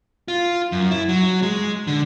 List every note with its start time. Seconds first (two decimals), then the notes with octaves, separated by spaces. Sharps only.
0.28 F4
0.72 F#2
0.91 E4
1.09 F#3
1.42 G#3
1.87 D3